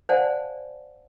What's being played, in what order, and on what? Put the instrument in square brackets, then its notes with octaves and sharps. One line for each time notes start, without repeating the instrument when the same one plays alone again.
[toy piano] C5 D5 F5 F#5 G#5 A5